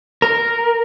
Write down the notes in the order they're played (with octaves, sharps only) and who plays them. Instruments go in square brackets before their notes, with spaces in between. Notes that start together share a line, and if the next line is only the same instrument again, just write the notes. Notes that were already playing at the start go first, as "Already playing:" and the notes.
[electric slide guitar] A#4